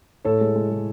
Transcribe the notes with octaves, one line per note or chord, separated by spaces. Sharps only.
A2 A4 C#5
G#3
G#3
G#3